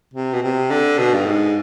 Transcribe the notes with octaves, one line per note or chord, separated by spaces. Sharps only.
C3
B2
C3
D3
B2
G2
G#2